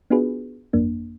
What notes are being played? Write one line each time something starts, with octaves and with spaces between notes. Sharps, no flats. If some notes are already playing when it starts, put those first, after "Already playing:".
B3 D4 F4 F#4 G#4 B4
G1 F2 A#3 D4